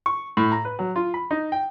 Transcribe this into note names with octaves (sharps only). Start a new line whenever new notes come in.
C#6
A2
A#5
B4
F#3
F4
B5
D#4
G5